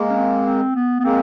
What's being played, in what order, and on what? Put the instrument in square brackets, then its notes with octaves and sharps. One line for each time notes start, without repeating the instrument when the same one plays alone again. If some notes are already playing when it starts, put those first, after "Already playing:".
Already playing: [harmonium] G#3 A#3
[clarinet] C#4
C4
C4
B3
B3
[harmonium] G#3 A#3 [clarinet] C4